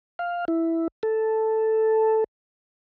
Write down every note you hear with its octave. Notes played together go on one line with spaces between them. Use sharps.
F5
E4
A4